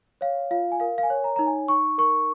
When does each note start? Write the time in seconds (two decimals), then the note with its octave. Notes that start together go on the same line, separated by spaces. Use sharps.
0.21 C#5 F5
0.51 F4 F5
0.72 G#5
0.80 A#4 F5
0.98 F5
1.03 G#5
1.10 C#5
1.24 A#5
1.36 D#4 A#5
1.46 G#5
1.68 D#4 C#6
1.98 A#4 C#6